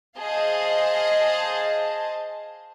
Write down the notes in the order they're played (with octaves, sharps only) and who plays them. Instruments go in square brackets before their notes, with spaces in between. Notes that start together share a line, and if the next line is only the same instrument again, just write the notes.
[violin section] G#4 C5 D#5 F5 A5